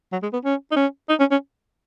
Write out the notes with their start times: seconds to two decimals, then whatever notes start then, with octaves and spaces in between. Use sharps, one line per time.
0.12 F#3
0.23 G#3
0.33 B3
0.45 C#4
0.71 D#4
0.76 C#4
1.09 D#4
1.20 C#4
1.31 C#4